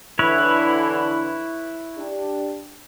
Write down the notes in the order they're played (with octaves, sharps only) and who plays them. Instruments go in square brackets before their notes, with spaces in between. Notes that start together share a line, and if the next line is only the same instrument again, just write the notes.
[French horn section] D3 E3 [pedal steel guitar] E4 B4 C#5
[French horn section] D4 G4